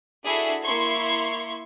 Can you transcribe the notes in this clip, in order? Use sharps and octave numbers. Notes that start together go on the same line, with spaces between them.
D4 E4 F#4 G#4 A4
A#3 E4 C6 C#6 G#6